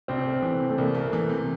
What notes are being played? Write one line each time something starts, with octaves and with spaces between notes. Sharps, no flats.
C2 C4
A3
E3
C3
A3
C2 A#3
A3
E3
C3